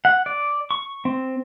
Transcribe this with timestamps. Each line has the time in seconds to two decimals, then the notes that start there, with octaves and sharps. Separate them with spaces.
0.05 F#5
0.26 D5
0.71 C#6
1.05 C4